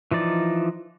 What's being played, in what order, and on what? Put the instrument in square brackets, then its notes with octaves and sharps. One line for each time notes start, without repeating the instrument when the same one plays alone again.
[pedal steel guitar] E3 F3 D#4 D5